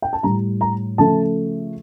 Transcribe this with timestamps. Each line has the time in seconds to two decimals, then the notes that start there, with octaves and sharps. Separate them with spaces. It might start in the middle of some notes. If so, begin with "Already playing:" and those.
0.02 G5
0.13 A5
0.23 A2 G3 A#5
0.61 A#5
0.98 C#3 F3 A3 A5